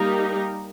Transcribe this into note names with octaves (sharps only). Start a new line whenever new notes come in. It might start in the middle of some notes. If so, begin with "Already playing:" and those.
Already playing: G3 A#3 D#4 G4 A#4